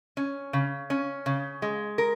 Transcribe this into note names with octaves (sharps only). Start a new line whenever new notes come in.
C#4
C#3
C#4
C#3
G#3
A#4